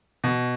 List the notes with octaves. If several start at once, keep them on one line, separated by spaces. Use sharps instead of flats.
B2